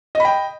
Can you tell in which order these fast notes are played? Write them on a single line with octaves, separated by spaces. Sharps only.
D#5 B5 G5